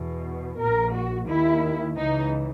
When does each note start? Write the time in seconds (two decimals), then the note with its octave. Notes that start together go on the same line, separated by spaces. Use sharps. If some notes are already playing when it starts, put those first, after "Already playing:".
Already playing: E2 B2
0.59 A#1 A#2 A#4
0.93 F#4
1.29 D#2 D#3 E4
1.97 C#2 C#3 E3 D#4